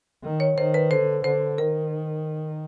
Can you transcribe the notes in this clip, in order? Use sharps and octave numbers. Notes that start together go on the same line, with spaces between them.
D#3
C#5
D#3 C5
B4
D3 C5
D3 C5
D#3 A#4